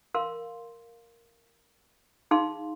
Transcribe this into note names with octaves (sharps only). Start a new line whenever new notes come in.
A#4 F5 C6
D#4 G#4 F5 C6